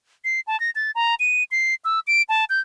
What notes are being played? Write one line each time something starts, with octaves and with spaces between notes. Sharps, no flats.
C7
A5
A#6
A6
A#5
D#7
C7
E6
D7
A5
G6